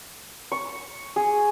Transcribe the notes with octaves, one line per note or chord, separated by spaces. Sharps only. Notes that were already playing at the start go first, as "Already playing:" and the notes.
C#6
G#4